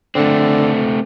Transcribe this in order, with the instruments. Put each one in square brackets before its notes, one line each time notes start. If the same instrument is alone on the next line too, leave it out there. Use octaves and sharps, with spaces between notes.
[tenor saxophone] D3 [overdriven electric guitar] A3 C4